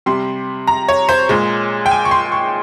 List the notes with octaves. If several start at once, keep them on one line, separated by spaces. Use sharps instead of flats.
C3 G3 C6
A#5
C#5
C5
A#2 G#3
G5
G#5
C#6
C6
C#6